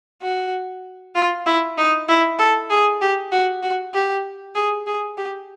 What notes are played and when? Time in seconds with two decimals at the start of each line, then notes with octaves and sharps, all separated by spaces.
0.22 F#4
1.15 F4
1.46 E4
1.78 D#4
2.09 E4
2.39 A4
2.70 G#4
3.01 G4
3.32 F#4
3.63 F#4
3.94 G4
4.55 G#4
4.87 G#4
5.18 G4